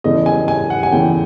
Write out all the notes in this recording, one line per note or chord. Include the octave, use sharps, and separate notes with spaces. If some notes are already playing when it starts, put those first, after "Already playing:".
E2 C#3 E3 A3 D#5
G#5
G#5
F#5
G#5
E2 C#3 E3 A3 G5